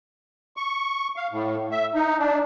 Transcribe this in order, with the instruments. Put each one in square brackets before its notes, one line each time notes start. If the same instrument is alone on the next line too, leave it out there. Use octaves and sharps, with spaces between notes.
[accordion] C#6
F5
A2
E5
D#4
D4